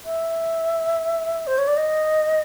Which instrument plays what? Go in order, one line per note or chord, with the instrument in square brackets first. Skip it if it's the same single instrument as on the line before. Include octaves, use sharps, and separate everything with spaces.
[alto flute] E5
C5
C#5
D5
D#5